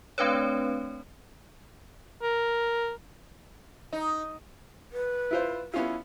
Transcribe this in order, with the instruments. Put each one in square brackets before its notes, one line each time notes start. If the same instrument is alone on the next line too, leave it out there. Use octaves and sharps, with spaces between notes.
[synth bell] A3 C4 D4 B4 C#5
[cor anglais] A#4
[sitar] D#4
[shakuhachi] B4
[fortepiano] E4 F4 C5
[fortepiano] B3 C#4 F4 [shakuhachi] E4